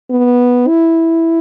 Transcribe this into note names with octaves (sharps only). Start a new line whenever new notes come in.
B3
E4